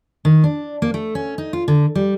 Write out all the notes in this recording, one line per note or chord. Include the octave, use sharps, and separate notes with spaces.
D#3
D4
A#3
A3
C#4
D#4
F4
D3
G3